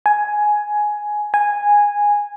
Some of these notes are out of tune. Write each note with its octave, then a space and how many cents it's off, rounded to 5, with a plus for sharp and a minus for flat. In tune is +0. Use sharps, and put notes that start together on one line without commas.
G#5 +10
G#5 -10